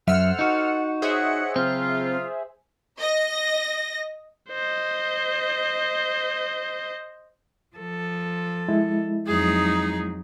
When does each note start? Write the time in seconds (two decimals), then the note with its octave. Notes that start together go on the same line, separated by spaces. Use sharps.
0.08 F#2 F#3 A4 C5 E5 F#5 E6 F6
0.39 D#4 F#4
1.02 G#4 C5 C#5 D#5 E5 F#5
1.56 C#3 F#3 C4 F4
2.99 D#5 A#6
4.50 C5 D#5
7.76 F3 A4
8.69 G#3 E4
9.27 F2 F#3 D#4 G#4